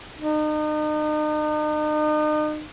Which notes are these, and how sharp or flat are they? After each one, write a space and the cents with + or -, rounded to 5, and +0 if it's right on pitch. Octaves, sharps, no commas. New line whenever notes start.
D#4 -40